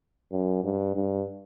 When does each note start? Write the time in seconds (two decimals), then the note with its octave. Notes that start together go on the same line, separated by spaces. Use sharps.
0.32 F#2
0.64 G2
0.96 G2